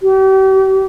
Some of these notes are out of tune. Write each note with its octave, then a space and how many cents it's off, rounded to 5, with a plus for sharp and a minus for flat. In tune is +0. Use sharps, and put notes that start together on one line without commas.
G4 -40